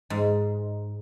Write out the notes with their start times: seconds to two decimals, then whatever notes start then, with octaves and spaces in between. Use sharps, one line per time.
0.10 G#2